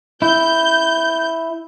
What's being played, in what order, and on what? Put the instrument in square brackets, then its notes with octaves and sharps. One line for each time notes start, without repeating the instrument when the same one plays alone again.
[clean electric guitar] E4 [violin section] G6